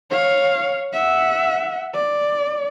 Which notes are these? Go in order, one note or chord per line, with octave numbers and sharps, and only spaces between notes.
C#5 F5
E5 F#5
D5